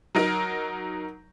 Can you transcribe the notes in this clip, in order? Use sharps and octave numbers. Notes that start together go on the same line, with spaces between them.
F#3 D#4 A#4